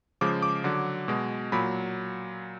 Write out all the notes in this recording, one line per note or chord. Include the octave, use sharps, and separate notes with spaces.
C#3 F3 G#3 D6
D6
D3 F#3
B2 G#3
A#2 F#3 B5